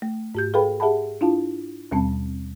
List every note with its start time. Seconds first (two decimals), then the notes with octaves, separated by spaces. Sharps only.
0.02 A3
0.35 G#2 G4 G6
0.54 G#4 A4 B4 F5 G5 B5
0.80 G4 G#4 E5 F#5 A5 B5
1.21 D4 E4 F4 F5 A5
1.91 D#2 B2 G3 C4 C#4 A5